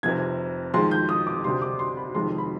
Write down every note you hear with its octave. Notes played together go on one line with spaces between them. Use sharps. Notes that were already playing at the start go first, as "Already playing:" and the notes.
F1 F2 C3 G#6
F2 D#3 G#3 C6
G6
D#6
D6
D2 C3 G3 C6
D6
C6
B5
F1 F2 D#3 G#3 C6
B5